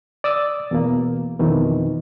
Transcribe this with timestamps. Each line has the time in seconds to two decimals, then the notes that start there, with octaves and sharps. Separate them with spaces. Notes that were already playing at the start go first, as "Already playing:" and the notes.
0.24 D5 D#6 E6 A6
0.71 E2 B2 A#3
1.39 F2 B2 D#3 E3